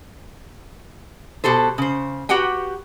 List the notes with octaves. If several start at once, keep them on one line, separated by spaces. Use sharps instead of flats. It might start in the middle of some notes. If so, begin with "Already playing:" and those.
B2 G4 A4 C5
C#3 C5
F#4 G4 B4 F#5 G5